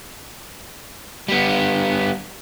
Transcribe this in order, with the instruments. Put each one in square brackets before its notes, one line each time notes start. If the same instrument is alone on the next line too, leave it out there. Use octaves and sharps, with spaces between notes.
[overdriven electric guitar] G3 B3